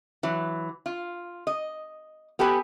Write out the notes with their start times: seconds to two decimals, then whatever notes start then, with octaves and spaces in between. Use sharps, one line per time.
0.23 E3 F#3
0.86 F4
1.47 D#5
2.39 B3 G4 A4 B4 G#5